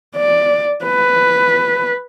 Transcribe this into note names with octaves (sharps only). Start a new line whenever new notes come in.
D5
B4